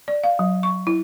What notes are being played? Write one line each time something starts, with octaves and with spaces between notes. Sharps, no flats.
D5
F5
F#3
C#6
E4